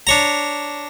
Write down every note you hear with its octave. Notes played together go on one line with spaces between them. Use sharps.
D4 C#5 A#5